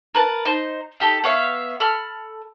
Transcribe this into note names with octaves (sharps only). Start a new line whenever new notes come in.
A#4 B4 A5
D#4 C5
D#4 G4 A4
B3 C#5 E5 F5
A4 B5 F6